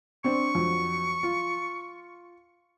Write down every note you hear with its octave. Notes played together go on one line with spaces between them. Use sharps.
C4 D4 C5 C#6
F2 F#3
F4